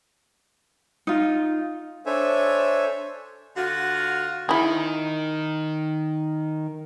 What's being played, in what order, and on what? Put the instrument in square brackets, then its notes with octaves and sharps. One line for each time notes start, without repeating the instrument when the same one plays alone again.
[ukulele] D#4 F4
[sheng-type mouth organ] D4 A4 C5 C#5 E5 G#5
[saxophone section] D3 F4 F#4
[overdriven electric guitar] D#3 [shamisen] E4 G#4